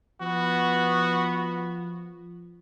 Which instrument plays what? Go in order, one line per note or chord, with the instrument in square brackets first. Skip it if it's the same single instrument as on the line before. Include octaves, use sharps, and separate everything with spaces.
[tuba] F3 [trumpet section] B3 [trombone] F#4